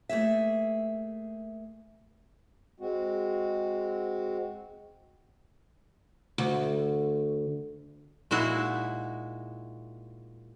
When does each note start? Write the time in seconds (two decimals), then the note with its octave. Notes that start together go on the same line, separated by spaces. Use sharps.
0.09 A3 A#3 G#4 E5
2.80 G#3 C4 F#4
6.38 D2
8.31 A#2 G#3 D#4 E4 F#4